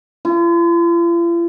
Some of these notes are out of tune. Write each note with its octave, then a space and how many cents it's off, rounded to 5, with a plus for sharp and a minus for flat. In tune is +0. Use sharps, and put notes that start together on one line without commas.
F4 -45